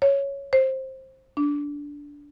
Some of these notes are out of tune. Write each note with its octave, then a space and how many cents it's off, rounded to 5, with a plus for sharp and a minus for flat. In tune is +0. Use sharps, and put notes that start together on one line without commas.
C#5 +0
C5 +15
D4 -15